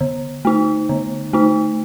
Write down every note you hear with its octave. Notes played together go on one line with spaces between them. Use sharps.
D3
A3 D#4
D3
A3 D#4